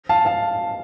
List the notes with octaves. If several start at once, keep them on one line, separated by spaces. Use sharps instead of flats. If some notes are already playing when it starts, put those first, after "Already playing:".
F5 A5
F5 A5